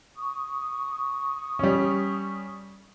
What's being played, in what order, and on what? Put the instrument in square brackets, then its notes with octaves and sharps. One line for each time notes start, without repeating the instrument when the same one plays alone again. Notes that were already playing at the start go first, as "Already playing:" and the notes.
[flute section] C#6 D#6
[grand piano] G3 C#4